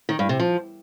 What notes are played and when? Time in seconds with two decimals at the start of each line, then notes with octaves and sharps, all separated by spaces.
0.09 D#3
0.19 G2
0.29 C3
0.40 F3